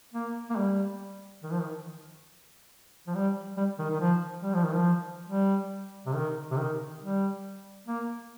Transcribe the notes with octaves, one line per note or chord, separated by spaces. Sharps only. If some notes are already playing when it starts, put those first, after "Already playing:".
A#3
A#3
G3
D#3
F3
D#3
F3
G3
G3
D#3
D#3
F3
G3
F3
D#3
F3
G3
C3
D#3
C3
D#3
G3
A#3